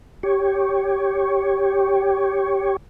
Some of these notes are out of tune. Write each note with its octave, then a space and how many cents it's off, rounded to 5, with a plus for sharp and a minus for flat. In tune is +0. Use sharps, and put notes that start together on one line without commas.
G4 +0 C#5 +0